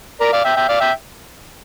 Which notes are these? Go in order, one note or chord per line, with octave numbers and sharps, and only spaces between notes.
A#4 D5
D5 F5
E5 G5
E5 G5
D5 F5
E5 G5